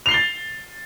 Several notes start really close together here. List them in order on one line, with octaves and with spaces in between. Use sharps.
F7 C7 G7 A6